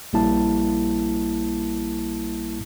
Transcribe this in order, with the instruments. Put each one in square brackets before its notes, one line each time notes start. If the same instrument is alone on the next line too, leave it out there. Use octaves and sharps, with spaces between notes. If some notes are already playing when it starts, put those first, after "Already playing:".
[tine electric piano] A#1 G3 A#3 E4 A5